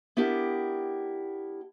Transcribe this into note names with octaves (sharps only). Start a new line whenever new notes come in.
B3 D4 E4 G4 A#4